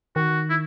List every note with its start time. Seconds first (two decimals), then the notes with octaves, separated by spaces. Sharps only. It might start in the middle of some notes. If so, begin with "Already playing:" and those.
0.16 D#3 F#4
0.50 E4